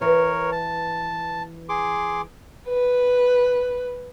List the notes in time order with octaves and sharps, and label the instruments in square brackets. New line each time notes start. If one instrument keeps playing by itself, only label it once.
[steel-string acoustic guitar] E3 B4 [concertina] A#4 C#5
[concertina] A5
G#4 C6 D6
[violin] B4